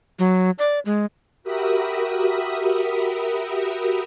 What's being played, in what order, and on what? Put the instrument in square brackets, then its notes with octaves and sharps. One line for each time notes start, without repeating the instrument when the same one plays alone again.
[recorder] F#3
D5
G#3
[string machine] F#4 G4 A#4 E5 B5 D#6